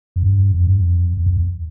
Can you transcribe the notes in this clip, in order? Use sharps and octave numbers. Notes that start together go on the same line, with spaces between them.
F2
G2
F2
G2
F2
E2
F2
E2